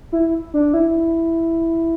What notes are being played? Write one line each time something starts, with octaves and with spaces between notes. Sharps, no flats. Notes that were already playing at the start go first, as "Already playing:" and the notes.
E4
D4
E4